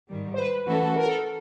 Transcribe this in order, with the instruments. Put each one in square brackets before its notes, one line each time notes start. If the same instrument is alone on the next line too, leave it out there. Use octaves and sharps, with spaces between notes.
[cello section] G#2 D#3 G3
[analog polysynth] C5
B4
[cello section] E3 A3 C#4 F#4 A4
[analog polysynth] A#4
A4